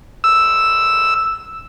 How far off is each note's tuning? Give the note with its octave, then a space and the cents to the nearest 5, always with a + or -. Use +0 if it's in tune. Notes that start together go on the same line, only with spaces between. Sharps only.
E6 +0